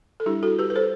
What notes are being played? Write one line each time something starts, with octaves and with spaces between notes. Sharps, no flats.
A4
G3 D4 E4 G4
F#4 A4
G4 B4
B4
A4 C5